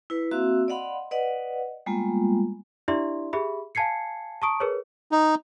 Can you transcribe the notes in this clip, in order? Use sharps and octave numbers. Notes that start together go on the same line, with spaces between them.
E4 B4
A#3 C4 F#4 E5 F5 E6
D5 D#5 F5 F#5 B5 C6
B4 D5 D#5 F#5
G3 G#3 A#3 B3 F4
D4 E4 G4 D5 E5 C6
G4 G#4 E5 B5
F5 G#5 A5 G#6 C7 C#7
A5 A#5 C#6 D#6 D7
G#4 A#4 B4 C#5
D#4